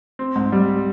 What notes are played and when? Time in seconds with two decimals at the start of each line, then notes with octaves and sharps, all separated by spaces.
0.19 C4
0.36 G#2
0.52 G3